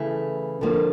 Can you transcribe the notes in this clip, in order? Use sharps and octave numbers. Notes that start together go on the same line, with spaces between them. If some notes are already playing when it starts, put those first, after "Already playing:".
Already playing: C#3 E3 A3
D3 F3 A#3